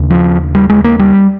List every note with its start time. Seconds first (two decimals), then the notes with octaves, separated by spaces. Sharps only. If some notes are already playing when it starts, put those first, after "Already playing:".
Already playing: D#2 C#3
0.10 F3
0.55 G3
0.69 G#3
0.84 A#3
0.99 G3